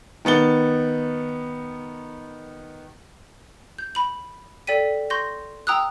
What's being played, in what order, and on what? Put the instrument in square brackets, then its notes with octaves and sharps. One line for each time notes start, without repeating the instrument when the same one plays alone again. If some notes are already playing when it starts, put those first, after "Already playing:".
[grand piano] D#3 B3 A6 G7
[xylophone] G6
B5 F#7
A4 D5 G5 B6 D#7
C6 C#6 G6 A#6
G5 A#5 D#6 E6 F#6